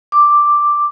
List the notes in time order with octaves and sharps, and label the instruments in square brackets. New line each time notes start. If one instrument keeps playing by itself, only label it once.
[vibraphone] D6